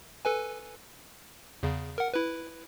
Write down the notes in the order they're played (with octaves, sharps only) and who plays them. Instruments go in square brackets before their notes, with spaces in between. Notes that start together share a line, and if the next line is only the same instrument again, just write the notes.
[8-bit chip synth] A4 B4 G#5
E2 C#3
A#4 F#5
E4 B4